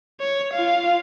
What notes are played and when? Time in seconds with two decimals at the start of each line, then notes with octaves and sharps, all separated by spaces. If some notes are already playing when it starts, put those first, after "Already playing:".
0.21 C#5
0.53 F4 F5